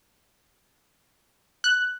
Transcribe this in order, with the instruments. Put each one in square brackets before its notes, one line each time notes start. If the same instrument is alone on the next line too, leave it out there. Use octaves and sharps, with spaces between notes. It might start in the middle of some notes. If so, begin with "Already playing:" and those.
[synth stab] F#6